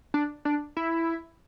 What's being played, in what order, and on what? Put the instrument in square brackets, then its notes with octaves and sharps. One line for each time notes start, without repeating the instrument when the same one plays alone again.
[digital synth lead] D4
D4
E4